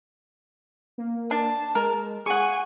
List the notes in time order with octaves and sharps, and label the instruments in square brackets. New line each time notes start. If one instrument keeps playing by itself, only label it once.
[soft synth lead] A#3
[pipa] D4 [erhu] A5
[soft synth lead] G#3 [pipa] A#4
[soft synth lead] G#4 [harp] F#5 C#6 [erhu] G#5